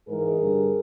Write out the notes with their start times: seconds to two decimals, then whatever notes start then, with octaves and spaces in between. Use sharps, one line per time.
0.08 G#2 E3 G#3 G#4 A#4
0.39 G2 D3 G3